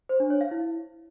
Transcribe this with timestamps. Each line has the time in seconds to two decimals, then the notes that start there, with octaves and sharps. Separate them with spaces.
0.09 C5
0.20 D4
0.30 C#5
0.41 F5
0.51 E4